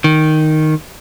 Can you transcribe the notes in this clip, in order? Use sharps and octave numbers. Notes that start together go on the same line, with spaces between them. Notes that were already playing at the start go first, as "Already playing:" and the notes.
D#3